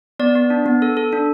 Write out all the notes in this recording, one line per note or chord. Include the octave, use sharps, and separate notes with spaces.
B3 D5
B3
D4
B3
A4
A4
D4